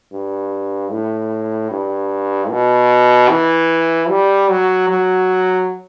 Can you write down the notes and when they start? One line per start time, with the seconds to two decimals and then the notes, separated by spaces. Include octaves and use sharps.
0.12 G2
0.91 A2
1.71 G2
2.50 B2
3.30 E3
4.10 G3
4.50 F#3
4.88 F#3